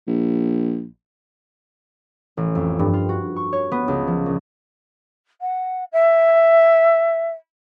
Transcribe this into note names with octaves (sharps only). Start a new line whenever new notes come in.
A#1
A1
F2
G2
F4
F#4
C#6
C#5
B3
C#2
F3
A#1
F#5
E5